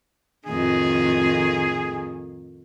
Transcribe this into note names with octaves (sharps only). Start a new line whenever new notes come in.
F2 A2 D#3 G#4